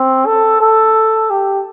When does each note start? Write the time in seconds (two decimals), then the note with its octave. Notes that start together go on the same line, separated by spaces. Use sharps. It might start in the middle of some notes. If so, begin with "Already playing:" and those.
Already playing: C4
0.26 A4
0.61 A4
1.30 G4